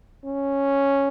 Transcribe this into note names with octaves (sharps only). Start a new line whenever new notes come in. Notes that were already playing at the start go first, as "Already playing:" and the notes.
C#4